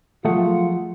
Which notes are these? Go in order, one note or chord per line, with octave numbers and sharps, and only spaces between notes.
F3 F#3 A3 F4 G#4 F#5